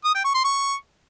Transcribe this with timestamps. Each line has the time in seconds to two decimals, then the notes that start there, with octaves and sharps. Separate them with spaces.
0.05 D#6
0.15 G5
0.24 C#6
0.34 C6
0.44 C#6